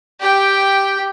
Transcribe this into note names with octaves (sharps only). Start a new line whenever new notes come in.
G4 G5